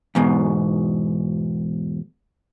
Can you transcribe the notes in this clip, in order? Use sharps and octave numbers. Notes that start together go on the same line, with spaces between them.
E2 G#2 B2